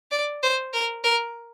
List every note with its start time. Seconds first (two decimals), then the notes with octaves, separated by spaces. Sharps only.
0.11 D5
0.43 C5
0.73 A#4
1.04 A#4